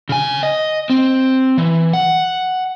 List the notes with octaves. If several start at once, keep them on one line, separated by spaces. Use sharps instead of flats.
C#3 G#5
D#5
C4
E3
F#5